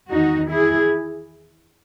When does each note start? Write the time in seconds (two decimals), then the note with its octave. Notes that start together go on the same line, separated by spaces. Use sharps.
0.10 E2 D#3 D#4 F#4
0.50 E4 G#4